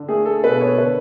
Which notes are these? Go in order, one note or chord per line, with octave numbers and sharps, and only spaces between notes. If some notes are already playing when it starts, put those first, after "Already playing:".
Already playing: D3
A3 G#4
A4
B2 B4
C#5
D3 B4